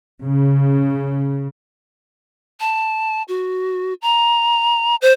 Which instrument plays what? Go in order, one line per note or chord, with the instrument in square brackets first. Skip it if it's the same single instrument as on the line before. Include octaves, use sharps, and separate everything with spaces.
[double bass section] C#3
[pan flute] A5
F#4
A#5
C5